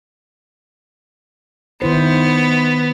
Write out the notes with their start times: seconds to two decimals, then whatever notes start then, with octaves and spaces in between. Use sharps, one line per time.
1.82 D#3 B3 E4 C5